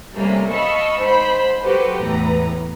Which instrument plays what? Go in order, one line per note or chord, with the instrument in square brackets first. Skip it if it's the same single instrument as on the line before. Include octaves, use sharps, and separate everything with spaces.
[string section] C3 G3 A3 A#3 C#4
D#5 F5 A5 B5 C#6 E6
G#2 C5 B5
F#3 F#4 G4 A4 B4 C5
E2 A2 B4 A#5